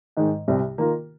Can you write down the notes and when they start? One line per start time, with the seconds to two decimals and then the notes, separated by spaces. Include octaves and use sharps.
0.17 G#2 D#3 G#3
0.48 C2 C3 G3 C4
0.78 D#3 A#3 F4 A#4